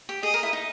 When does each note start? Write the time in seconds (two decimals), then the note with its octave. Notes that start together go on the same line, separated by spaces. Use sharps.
0.09 G4
0.23 G#4 D#5
0.34 A#4
0.43 E4
0.53 D#4